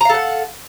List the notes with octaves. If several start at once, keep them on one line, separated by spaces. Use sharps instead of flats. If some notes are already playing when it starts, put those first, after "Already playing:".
A4 F5 F#5 A#5